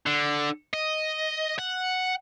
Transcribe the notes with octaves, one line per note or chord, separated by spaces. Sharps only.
D3
D#5
F#5